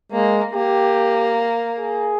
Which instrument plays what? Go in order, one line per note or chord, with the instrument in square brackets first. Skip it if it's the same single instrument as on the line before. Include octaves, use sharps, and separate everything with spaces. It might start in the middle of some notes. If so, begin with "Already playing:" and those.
[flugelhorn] G#3 [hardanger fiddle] A#3
[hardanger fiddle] A#3 [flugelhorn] G4
[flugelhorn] G#4